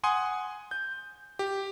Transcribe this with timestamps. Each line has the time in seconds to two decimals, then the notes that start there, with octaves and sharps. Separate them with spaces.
0.03 F#5 G#5 C6 D#6
0.71 G6
1.39 G4